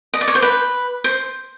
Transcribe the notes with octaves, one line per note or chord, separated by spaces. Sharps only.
D#5
D5
C#5
C5
B4
C5